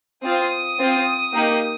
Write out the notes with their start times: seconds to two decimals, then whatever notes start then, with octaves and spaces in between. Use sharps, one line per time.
0.24 C4 F4 D#6
0.79 C4 F4
1.33 A#3 D#4 G4